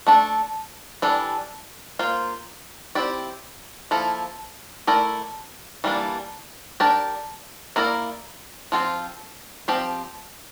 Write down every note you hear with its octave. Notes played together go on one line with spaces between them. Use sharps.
A3 D4 A4
E3 G3 D4 A4
A#3 F4 C5
C4 E4 G4 D5
F3 A#3 E4 A4
A3 E4 A#4 D5
E3 G3 A#3 D4
D4 G4 A#4 D5
A#3 E4 A#4 D5
F3 C4 F4 A4 C5
F3 C4 G4 C5